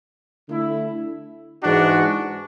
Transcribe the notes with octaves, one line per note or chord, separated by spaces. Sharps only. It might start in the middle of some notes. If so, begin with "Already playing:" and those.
D3 A3 E4
G#2 E3 G#3 D4 F#4